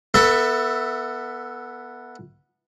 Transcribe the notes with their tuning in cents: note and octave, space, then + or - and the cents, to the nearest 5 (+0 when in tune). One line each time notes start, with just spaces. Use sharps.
B3 -10 A4 +20 E5 +0